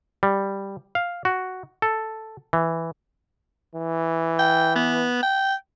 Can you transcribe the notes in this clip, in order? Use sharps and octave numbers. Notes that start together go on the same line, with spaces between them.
G3
F5
F#4
A4
E3
E3
G5
B3
G5